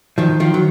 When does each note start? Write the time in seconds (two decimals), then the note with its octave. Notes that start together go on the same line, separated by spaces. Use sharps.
0.18 D#3 F3
0.40 D#3 F3
0.54 F#3